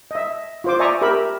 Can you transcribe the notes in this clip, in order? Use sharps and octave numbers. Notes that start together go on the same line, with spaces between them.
D#5 E5
F4 C5 D6
D5 E5 G#5 A#5 C#6 D#6
G4 A#4 E5 B5